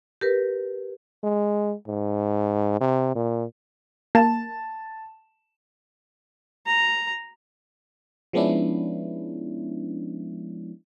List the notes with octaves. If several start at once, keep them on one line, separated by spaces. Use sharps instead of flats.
G4 A#4 B4
G#3
G#2
C3
A#2
A#3 A5
A#5
F3 G#3 B3 C#4 D4 E4